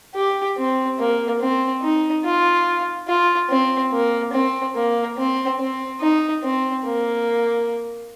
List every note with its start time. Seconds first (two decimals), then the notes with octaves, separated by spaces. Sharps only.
0.15 G4
0.57 C4
0.99 A#3
1.41 C4
1.83 D#4
2.24 F4
3.08 F4
3.50 C4
3.92 A#3
4.33 C4
4.75 A#3
5.17 C4
5.59 C4
6.01 D#4
6.43 C4
6.84 A#3